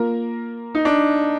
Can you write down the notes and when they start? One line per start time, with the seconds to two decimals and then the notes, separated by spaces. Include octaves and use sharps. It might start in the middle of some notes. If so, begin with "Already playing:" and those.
Already playing: A#3 F4 A#4
0.75 D#4
0.85 D4